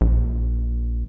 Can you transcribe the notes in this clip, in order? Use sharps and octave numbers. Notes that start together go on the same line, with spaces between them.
A#1